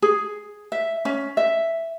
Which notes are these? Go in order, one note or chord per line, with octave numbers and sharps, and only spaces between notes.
G#4
E5
C#4
E5